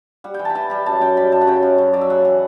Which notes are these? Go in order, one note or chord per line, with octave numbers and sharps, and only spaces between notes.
G3 F#5
E3 G5
A5 B5
E3 A5
G3 B5
F#2 A5
F#2 G5
G3 B5
F#2 A5
F#5
C#3 G5
F#2
F#2
F#3 D5
E5
C#3 F#5
E3